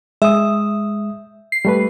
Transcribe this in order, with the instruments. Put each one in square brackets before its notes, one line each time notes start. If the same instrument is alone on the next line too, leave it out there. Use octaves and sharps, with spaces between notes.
[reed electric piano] G#3 D#6 [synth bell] E5
[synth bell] C7
[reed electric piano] G3 A3 B4